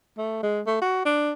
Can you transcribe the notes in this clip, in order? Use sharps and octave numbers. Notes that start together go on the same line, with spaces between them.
A3
G#3
A3
F#4
D4